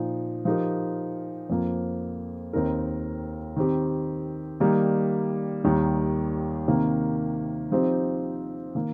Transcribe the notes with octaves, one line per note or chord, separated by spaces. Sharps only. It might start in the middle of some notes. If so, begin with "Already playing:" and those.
Already playing: A#2 F3 D#4
F3 D#4 G4 A#4
F2 F3 A#3
D#2 D#3 C4 D#4 A#4
D#3 C4 G4
D#3 G3 A#3 D#4
D#2 D#3 G3
C3 D#3 A#3
F3 C4 D#4 G4 C5
D#3 A#3